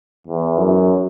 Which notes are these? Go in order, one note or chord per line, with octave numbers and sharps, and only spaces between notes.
E2
F#2